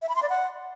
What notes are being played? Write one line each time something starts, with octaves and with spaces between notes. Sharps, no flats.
E5
B5
C6
D5
F#5